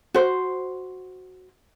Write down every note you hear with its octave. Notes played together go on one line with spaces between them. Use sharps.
F#4 C5